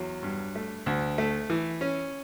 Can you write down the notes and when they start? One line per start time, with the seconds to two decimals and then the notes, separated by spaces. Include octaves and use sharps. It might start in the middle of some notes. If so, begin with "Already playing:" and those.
Already playing: E2 F#3
0.23 G2
0.55 A3
0.86 D2
1.18 A3
1.50 E3
1.81 C#4